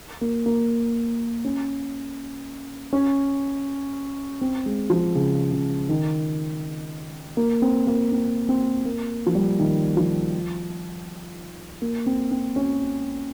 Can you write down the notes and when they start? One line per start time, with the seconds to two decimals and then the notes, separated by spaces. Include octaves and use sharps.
0.21 A#3
0.46 A#3
1.45 C#4
2.93 C#4
4.41 C4
4.66 G#3
4.90 F3
5.15 C#3
5.52 C#3
5.89 D#3
7.37 A#3
7.62 C4
7.87 A#3
8.12 C4
8.49 C4
8.85 A#3
9.26 F3
9.35 G3
9.59 D#3
9.97 F3
11.82 A#3
12.06 C4
12.31 C4
12.56 C#4